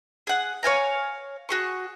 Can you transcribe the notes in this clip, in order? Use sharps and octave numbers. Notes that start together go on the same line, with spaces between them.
G#4 F#5
C#5 F5 G#5 A#5
F#4 G#4 C#6